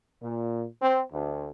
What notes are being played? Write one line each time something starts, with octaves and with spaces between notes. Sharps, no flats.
A#2
C4
D2